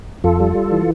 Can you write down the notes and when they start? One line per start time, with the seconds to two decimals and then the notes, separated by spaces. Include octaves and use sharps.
0.24 F2 F4 A4
0.40 G3
0.55 G3
0.72 E3